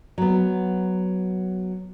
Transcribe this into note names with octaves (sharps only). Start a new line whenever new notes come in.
F#3 B3